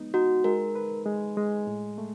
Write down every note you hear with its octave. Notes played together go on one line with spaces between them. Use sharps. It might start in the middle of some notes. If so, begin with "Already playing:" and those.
Already playing: G#3 B3 D#4
D#4 F#4
G#3 A#4
B4
G#3
G#3
A2
A3